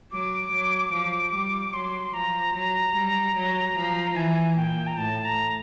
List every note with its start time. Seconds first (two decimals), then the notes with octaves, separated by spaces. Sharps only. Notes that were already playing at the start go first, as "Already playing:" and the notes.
0.11 F#3 D6
0.52 F#3
0.92 F3
1.33 G3
1.73 F#3 C6
2.14 F3 A#5
2.54 F#3
2.95 G3
3.36 F#3
3.76 F3
4.16 E3 G#5
4.56 A#2 G5
4.87 A#5
4.97 A2 A5
5.25 A#5